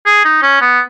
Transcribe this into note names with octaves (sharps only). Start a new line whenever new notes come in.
G#4
D#4
C#4
B3